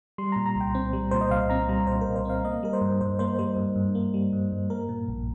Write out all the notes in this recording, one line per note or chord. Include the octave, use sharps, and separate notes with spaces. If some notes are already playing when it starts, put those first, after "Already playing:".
G3 C6
A#2 A#5
A#5
C2 G5
C4
G3
A#2 C5
D#5
C2 F5
C4 A#5
G3 A#5
A#2 C5
A#4
C2
C5
C4 F5
A#3 D#5
G3 A#4
C5
G2
G2 C5
A#3 C5
G3 C5
G2
G2
A#3
G3
G2
G2
A#3 A#4
A#2
A#1